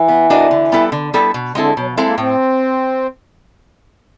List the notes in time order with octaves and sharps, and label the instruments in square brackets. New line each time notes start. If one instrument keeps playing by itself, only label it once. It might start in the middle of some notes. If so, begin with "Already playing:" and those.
Already playing: [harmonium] E3
[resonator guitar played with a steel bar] B3
D4 F#4 A#4 D#5
D3
G3 B3 E4 A4
D3
G3 B3 E4 A4
B2
[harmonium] D3 [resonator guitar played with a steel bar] G#3 C4 E4 A4
[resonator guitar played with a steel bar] B2 [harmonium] F#3
[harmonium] F3
[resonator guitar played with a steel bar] G#3 C4 E4 A4
[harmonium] A#3
[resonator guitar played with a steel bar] A2 [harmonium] C4